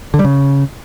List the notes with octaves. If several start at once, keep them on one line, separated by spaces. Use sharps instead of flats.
D3
G3
C#3